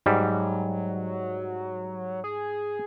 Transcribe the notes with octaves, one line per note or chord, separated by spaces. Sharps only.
G#2 F#3 G3
G#4